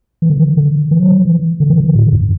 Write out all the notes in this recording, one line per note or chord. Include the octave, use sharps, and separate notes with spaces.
E3
D3
E3
D3
E3
F#3
E3
E3
D3
E3
D3
A2
F#2